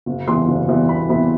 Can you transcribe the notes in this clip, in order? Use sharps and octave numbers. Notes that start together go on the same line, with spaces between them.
F#1
E2 C3 E3 G3 C6
F#1
E2 C3 E3 G3
F#1 B5
E2 C3 E3 G3 B5